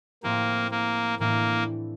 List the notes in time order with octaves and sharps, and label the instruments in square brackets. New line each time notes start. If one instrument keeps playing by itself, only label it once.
[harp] A2 F3 C4 E4 G4 [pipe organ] A#3
[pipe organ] A#3
[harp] A2 E3 A3 D4 [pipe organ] A#3